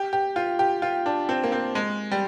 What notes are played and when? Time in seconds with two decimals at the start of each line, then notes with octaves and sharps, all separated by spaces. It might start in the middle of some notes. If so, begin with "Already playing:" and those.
Already playing: G4
0.13 G4
0.36 F4
0.59 G4
0.82 F4
1.06 D4
1.29 C4
1.43 A#3
1.52 C4
1.75 G#3
2.11 G3